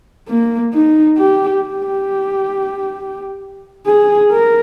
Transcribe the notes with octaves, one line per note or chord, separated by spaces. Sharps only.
A#3
D#4
G4
G4
G#4
A#4